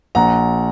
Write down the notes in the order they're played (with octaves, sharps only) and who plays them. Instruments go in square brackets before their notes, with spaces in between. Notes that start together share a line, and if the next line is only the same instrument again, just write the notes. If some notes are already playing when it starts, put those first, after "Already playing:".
[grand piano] A#1 F#5 A#5